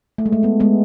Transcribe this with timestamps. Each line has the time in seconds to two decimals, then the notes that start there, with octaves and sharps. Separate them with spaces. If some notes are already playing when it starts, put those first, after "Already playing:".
0.18 A3
0.26 G#3
0.32 A3
0.43 G#3 B3
0.60 G#3 B3